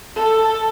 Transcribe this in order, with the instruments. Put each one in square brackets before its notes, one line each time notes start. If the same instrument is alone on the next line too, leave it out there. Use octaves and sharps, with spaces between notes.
[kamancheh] A4